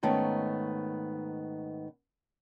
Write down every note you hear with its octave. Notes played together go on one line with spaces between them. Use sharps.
G#2 D#3 A3 B3 C#4